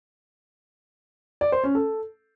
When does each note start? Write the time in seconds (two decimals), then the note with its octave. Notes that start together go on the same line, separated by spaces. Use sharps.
1.41 D5
1.52 C5
1.64 C#4
1.75 A4